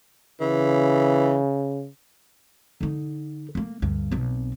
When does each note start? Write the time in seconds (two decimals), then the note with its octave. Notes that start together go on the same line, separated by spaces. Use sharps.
0.41 C#3 E3
2.81 D3 D#4
3.55 A3 A#3
3.82 D2 G2
4.11 B1 C4